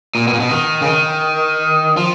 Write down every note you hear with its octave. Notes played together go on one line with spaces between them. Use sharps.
A#2
B2
A#2
B2
D#3
C#3
D#3
F3